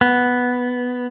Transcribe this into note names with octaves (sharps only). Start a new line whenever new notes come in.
B3